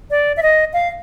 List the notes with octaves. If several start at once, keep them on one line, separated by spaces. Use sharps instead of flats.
D5
E5
D#5
F5